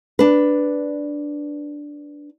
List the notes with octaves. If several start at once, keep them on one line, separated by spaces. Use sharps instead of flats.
D4 B4